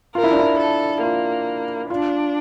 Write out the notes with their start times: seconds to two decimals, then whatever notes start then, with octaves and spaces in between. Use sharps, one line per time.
0.15 F4 A#4
0.23 E4
0.31 D4
0.39 E4
0.58 A4
1.02 A#3 F4
1.90 D4 F4